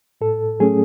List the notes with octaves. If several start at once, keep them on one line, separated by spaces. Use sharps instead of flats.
A2 A4
F#3 A3 C#4 G#4